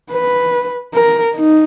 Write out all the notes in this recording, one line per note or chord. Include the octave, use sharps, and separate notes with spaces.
B4
A#4
D#4